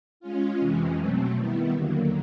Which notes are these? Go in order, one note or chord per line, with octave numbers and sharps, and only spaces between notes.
G#3 C#4 F4
F2 C3 E3 G#3 C#4
B2 F#3 A3 C4
D#3 G3 B3 E4
D#2 D3 F#3 A#3